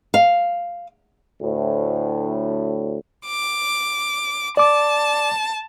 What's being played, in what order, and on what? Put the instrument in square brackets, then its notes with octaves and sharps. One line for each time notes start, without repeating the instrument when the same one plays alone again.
[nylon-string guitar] F5
[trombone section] D2 A2
[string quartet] D6
[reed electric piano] D5 D6 [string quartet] A5